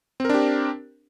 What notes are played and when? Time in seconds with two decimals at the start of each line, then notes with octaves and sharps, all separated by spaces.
0.20 C4
0.25 A#4
0.30 D4
0.34 G4